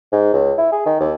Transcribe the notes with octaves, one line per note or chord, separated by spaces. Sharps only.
G#2
C#2
E4
G#4
D#3
D#2